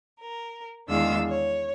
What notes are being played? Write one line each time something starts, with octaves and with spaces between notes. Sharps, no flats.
A#4
E2 D#3 G#3 D4 F5 E6
C#5